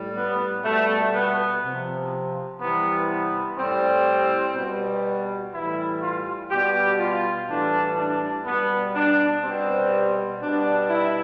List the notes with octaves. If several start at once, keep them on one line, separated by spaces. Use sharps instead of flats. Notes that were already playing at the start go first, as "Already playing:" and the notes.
Already playing: A2 G3
B3
B2 G3 A3
B3
C3 F3
C3 E3 G3 B3
B3
A2 G3 C4
B2 G3
A2 E3 G3 E4
F4
B2 G3 G4
F4
A2 E3 G3 D4
D4
B2 G3 B3
D4
B2 G3 C4
B2 G3 D4
E4